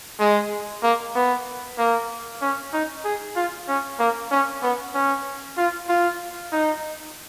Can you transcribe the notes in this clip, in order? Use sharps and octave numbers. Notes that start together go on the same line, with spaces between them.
G#3
A#3
B3
A#3
C#4
D#4
G#4
F4
C#4
A#3
C#4
B3
C#4
F4
F4
D#4